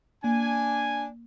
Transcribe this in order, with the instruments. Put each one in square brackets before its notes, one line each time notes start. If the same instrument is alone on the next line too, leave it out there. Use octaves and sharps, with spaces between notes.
[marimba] A#3 [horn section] D4 G#5